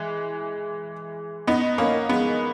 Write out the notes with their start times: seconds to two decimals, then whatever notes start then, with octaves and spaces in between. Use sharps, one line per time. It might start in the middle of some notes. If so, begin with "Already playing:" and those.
Already playing: E3 G#3
1.47 B3 D#4
1.78 A#3 C#4
2.09 G#3 B3